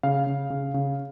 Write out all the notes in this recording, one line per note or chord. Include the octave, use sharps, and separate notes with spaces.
C#3 F5
C#3
C#3
C#3